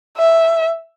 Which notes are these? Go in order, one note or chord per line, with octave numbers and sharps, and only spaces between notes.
E5